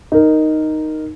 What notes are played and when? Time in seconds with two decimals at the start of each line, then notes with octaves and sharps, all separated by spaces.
0.12 D#4 A#4